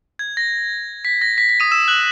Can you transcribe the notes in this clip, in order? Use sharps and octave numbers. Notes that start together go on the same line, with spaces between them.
G#6
A#6
B6
A#6
B6
B6
D#6 D#7
E6 E7
F#6 F#7